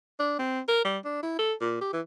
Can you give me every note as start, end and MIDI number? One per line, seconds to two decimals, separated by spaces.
0.19 0.37 62
0.39 0.60 60
0.68 0.84 70
0.85 0.98 55
1.04 1.22 62
1.23 1.35 64
1.39 1.53 69
1.60 1.78 46
1.81 1.92 67
1.93 2.00 52